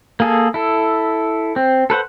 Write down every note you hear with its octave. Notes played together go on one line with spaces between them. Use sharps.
A#3 G#4 A4
E4 A4
C4
A4 B4 C5 F#5